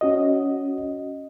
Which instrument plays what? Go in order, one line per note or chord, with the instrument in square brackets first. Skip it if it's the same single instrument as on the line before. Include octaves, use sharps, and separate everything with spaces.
[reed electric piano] C#4 F#4 D#5